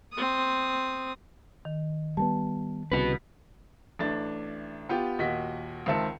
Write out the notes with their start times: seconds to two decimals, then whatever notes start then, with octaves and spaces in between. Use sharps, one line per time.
0.13 C4 D#6
1.65 D#3
2.17 G3 A#3 B3 A5
2.92 C2 C#3 F#4 B4
3.99 A1 A3 D4 A6
4.89 B3 F4 G4
5.19 D#2 A#2 F#4 D#5 B6
5.86 C#2 D#3 C4 E5 A5 C#7